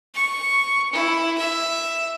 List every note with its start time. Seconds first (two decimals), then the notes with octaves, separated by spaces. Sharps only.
0.15 C#6
0.93 E4
1.38 E5